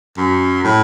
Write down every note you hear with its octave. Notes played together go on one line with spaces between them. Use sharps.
F#2
A2